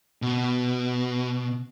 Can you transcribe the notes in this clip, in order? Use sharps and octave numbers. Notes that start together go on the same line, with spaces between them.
B2